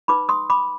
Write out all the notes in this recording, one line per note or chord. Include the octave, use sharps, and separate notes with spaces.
D#4 B4 B5 D6
C6 D#6
B5 D6